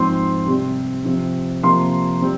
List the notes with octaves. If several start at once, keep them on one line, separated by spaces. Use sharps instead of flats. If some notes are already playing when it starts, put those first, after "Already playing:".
Already playing: G#2 F3 C4 C6
C3 G3 C4
C3 F3 C4
C3 F3 A#3 C6
G3 C4